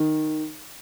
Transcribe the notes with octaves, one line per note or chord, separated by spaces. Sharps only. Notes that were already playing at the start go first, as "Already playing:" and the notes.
Already playing: D#3